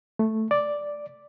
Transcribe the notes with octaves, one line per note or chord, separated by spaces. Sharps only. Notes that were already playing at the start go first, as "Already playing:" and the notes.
A3
D5